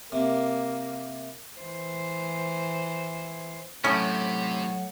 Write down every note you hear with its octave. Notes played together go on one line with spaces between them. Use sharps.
C3 A#3
E3 C5
A2 C3 F#3 C#4 F#5